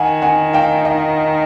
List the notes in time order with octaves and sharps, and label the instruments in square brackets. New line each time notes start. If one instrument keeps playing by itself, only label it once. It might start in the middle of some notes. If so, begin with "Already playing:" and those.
Already playing: [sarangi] D#3 [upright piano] F#5 G#5
[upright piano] F#5 G#5
F5 G5
D#5 F5